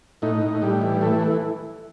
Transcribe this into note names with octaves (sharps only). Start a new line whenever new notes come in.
A2 D#4
A2
A2 G3
E3
E3 A3